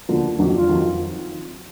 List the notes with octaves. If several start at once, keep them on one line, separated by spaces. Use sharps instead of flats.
D2 D3 F3 A#3
F2 D#3 F#3 D4
F4
F2 D#3 F#3